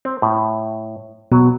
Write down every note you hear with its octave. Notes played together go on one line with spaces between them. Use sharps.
C4
A2
B2 F#3